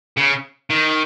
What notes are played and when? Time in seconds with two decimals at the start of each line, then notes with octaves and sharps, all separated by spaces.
0.17 C#3
0.70 D#3